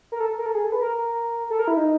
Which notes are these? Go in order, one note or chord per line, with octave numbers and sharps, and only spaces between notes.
A#4
A4
A#4
A4
G#4
A4
B4
A#4
A4
A#4
E4
D#4